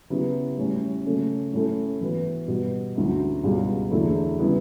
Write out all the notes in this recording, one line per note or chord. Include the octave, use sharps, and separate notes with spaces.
C#3 F#3 B3 E4 G4
A2 G3 C#4
C#3 F#3 A3 C#4
A2 F#3 C#4 E4 A4
E3 B3 F#4 B4
B2 G3 B3
D2 D3 F#3 C#4 E4
C#2 B2 G3
E2 D3 F#3 A3 E4
C#3 G3 B3 E4